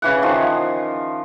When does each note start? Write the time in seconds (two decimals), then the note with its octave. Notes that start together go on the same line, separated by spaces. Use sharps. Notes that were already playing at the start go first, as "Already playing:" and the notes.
0.02 C#3 E3 F#5
0.22 D#3 F3